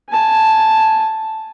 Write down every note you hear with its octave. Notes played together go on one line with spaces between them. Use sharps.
G#5 A5